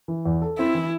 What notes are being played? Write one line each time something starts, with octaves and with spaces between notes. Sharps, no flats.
E3
E2
A4
C4 E4
E3